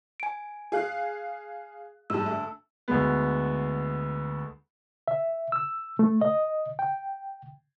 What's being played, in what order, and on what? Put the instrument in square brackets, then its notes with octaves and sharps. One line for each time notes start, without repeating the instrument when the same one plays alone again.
[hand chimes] G#5 D7
[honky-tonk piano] G#4 F5 F#6
[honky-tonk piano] G#2 G3 [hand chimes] A5 E6
[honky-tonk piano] D2
[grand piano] D2 G#3 B3
[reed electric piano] E5
E6
A3
D#5
G5